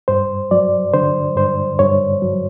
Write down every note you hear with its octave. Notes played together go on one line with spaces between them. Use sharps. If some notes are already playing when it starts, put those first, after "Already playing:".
G2 C5
F#3 D5
D3 C5
G2 C5
G2 C#5
F#3